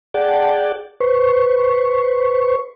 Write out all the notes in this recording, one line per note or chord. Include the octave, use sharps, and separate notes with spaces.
G#4 D5 F#5 G5 A5
B4 C5 C#6